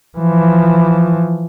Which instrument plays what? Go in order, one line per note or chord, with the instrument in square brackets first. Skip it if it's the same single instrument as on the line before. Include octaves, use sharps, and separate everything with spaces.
[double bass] E3 F3